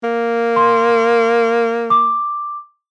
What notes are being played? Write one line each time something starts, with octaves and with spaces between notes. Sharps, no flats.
A#3
C6
D6